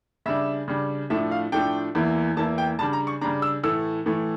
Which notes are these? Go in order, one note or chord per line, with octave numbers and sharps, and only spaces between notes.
C#3 G3 D4 E5
C#3 G3 D4
A2 F3 A3 D4 E5
F5
A2 F3 A3 D4 G5
E2 E3 A#3 E4
E2 E3 A#3 E4 A5
G5
C#3 G3 D4 A5
A#5
C#6
C#3 G3 D4 A#5
E6
A2 E3 A3 E6
A2 E3 A3